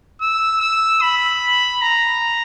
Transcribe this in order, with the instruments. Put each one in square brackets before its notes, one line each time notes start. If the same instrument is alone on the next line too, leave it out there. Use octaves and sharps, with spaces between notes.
[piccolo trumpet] E6
E6
B5
A#5